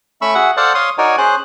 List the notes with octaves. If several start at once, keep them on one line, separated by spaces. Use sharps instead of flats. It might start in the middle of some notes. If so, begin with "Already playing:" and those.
A3 C#4 B5 C#6 E6
F#4 G#4 E5 F#5
A4 C5 D5 F5 F#5 A5
C#5 F5 C6 D#6
D#4 F#4 A#4 C#5 D5 G#5
C#4 G#4 C5 F#6